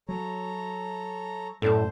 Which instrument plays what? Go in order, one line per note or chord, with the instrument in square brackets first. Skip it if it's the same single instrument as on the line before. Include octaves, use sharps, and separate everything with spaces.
[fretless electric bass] F#3 [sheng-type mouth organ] A4 C#5 A#5
[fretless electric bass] F#2 [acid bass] A2 [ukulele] A4 D5 A5 [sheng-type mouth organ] C5